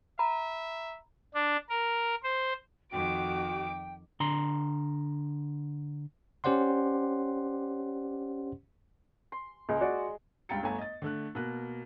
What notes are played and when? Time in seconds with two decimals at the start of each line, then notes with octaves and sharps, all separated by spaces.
0.19 E5 A#5 B5
1.34 D4
1.69 A#4
2.23 C5
2.92 F2 D#3 F#4 G5 D6 D7
4.20 D3 A#5 C6
6.44 C#4 G4 C5 D5 F#5 C6
9.32 C6
9.69 C#2 G#3
9.81 F#4 D5
10.49 C#2 G2 G5 A#5 A6 C#7
10.63 G1 A3 G#5 A#5
10.78 D#5 A6
11.02 D3 A3 F#6
11.35 B2 A#3 F#6